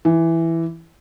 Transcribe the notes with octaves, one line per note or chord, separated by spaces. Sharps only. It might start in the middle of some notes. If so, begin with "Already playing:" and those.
E3